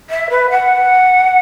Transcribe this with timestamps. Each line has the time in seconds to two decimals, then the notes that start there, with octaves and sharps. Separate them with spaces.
0.10 E5
0.30 B4
0.50 F#5